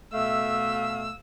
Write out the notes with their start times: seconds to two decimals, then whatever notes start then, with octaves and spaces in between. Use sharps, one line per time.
0.14 B2 A3 E5 F5 E6